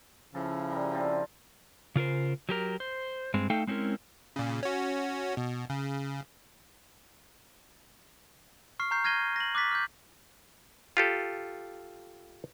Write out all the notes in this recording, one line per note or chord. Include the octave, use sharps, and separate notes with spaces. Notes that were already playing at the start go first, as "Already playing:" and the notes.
C#3 F3 E4 A4
G3 A#4 D#5
D3 C4 F4
C#3 F4 A#4 C5
F#3 G4 A#4
C5
G2 G#3 C4
A3 D#4 A4 F5 G5
G#3 C4 C#4 E4 A#4
A#2 C#3
C#4 F#4
B2
C#3
C#6 F6 C7
A#5 C#6 G6 C7
F6 G#6 A#6 D#7 G7
A#6 F#7
D6 F#6 A6 B6
F6 G6
F4 G4 A4